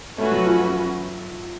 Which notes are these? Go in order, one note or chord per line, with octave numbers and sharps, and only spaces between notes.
A3 C#4 F#4 B4
F#3
F3